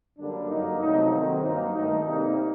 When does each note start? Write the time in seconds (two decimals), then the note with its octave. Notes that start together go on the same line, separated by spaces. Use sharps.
0.18 F#2 D3 G3 A#3 D4
0.49 G2 F#3 A#3 D#4
0.80 C3 F#3 A3 D#4
1.11 C3 D#3 F#3 A#3 C4
1.42 G2 F#3 A#3 D#4
1.73 G2 D#3 A3 D#4
2.04 C3 G3 A#3 D#4